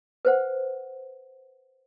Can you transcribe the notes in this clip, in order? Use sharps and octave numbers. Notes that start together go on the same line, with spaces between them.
B4 C5 F#5